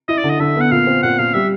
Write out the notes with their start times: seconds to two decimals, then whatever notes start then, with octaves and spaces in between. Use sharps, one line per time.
0.08 E4 D#5
0.18 D5
0.24 D3
0.30 D#5
0.39 D3 E5
0.56 B3 F#5
0.71 A#2 F5
0.87 C4
1.03 A#2 F#5
1.19 A#2 F5
1.34 G3 E5